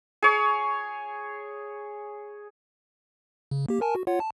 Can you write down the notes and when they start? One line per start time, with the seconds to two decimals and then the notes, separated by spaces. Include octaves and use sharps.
0.22 G#4 C#5
3.51 C#3
3.69 A#3 G4
3.81 A#4 G#5 A5
3.95 F#4
4.07 F4 C#5 F#5
4.20 A5